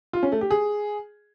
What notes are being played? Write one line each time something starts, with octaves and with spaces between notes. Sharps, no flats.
F4
C#4
A3
G4
G#4